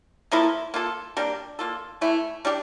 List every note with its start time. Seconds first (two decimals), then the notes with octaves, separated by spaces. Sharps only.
0.32 F3 A#3 E4 A4
0.74 A#3 F4 A4
1.17 G3 A#3 D4 G4
1.59 A#3 F4 A4
2.01 E3 A3 E4
2.45 G3 D4 G4